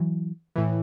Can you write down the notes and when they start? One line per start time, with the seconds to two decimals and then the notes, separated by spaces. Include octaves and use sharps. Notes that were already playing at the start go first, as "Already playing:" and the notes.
Already playing: E3 F#3
0.56 A2 E3